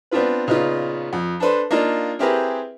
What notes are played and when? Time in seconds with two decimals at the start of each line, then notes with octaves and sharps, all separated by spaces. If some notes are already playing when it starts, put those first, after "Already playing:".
0.11 B3 C4 D4 F4 B4
0.46 A#2 C#3 B3 D#4 F4
1.13 F2
1.40 D4 A4 B4 C5
1.71 A#3 D4 D#4 F4
2.19 C4 E4 G4 G#4 A#4 B4